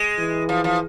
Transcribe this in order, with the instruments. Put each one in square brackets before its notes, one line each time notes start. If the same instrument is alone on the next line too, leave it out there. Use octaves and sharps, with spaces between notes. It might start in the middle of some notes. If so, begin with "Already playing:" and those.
Already playing: [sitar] G#3
[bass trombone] E3
[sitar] F3
F3